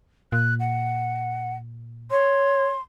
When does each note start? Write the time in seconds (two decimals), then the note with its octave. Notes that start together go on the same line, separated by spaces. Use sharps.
0.32 A#2 F#6
0.60 F#5
2.11 C#5 C6